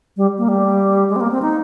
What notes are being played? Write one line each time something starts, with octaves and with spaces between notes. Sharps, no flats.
G3
A#3
G3
G#3
C4
A#3
C4
D#4